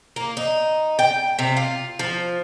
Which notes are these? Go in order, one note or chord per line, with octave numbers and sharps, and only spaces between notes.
A#3
D#4
G5
C3
F4
F3